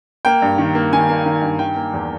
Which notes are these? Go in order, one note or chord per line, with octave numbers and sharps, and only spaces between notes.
A#3 G5
G2
D#3
A#3
D#3 G#5
A#3
D#3
G2
D#3 G5
A#3
E2